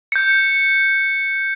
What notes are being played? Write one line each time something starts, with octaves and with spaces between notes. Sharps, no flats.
G6 C#7